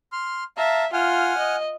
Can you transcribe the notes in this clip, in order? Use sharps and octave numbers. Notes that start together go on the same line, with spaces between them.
C6 F6
E5 F5 A5 A#5
F4 F#5 G#5 F6
D#5